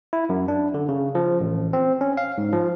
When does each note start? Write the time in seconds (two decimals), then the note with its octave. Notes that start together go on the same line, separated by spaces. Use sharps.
0.13 E4
0.29 F#2
0.48 D4
0.74 D3
0.89 C#3
1.15 F3
1.40 A1
1.73 C4
2.01 C#4
2.17 F5
2.38 G#2
2.53 F3